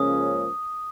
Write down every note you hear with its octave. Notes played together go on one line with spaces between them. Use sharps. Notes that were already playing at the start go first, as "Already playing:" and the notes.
Already playing: C#2 C#3 F3 A#3 C#4 D#6